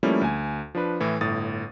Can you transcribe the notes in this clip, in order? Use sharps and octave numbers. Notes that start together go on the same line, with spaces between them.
F3 G3 A3 A#3 C#4 E4
D2 G#5
F3 D4 B4
A2 E3 E4
G1 A2 D#6 A6